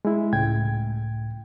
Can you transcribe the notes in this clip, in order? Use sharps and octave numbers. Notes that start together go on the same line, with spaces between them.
G#3 E4
C#2 A2 G5 G#6